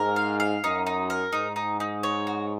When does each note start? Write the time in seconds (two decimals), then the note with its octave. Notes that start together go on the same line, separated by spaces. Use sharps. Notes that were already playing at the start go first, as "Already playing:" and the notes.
Already playing: G#2 A#4
0.16 F5
0.40 F5
0.64 F#2 D#4
0.86 D#4
1.10 A#4
1.32 G#2 D#4
1.56 D#4
1.80 D#4
2.03 C#5
2.27 F#4